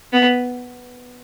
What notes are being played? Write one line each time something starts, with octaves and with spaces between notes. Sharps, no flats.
B3